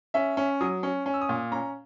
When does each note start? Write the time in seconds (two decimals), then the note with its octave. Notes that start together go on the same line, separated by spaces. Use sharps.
0.14 C#4 E5
0.37 C#4
0.61 F#3 D#6
0.83 C#4
1.06 C#4
1.14 E6
1.21 D#6
1.29 A#2
1.52 C#4 A#5